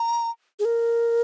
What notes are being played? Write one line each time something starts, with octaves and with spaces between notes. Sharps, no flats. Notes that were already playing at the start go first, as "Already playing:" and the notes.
Already playing: A#5
G#4
A#4